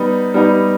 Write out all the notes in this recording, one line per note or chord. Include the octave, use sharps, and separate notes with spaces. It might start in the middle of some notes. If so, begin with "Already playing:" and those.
Already playing: G3 B3 D#4
G3 B3 D#4